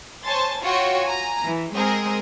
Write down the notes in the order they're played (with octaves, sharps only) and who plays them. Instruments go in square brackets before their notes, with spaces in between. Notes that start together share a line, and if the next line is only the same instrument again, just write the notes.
[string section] C5 C#5 G#5 A5 C6 A6
F4 F#4 C#5 F#5 G5
G#5 A#5
E3
G#3 C4 G#4 A#4